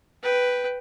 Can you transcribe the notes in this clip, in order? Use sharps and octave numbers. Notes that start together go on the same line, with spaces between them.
B4 G5